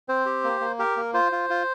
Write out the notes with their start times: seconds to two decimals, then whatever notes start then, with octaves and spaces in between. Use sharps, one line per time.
0.09 C4 C5
0.26 G4
0.44 A#3
0.61 A#3
0.79 G4 A#4
0.97 A#3
1.14 F4 C5
1.32 F4
1.50 F4